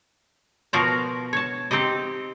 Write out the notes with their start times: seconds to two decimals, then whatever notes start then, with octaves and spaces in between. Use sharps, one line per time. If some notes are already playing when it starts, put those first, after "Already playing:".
0.73 B2 F3 F#4 A#4 F5 A#5
1.33 C#5 A5
1.71 C4 D#4 G4 D#5